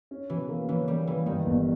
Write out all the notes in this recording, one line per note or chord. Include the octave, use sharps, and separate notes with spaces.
C#4
B2 E3
A#3
E3 C#4
G3 A#3
E3 A#3
G2 D#3
G1